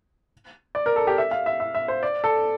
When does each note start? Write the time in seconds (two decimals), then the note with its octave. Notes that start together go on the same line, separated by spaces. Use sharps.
0.75 D5
0.86 A#4
0.96 A4
1.07 G4
1.18 E5
1.31 F5
1.46 E5
1.60 E5
1.75 E5
1.88 C5
2.03 D5
2.24 A4